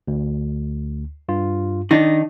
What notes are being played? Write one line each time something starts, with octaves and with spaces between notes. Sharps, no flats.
D2
G2 F4
D#3 D4 D#4 A#6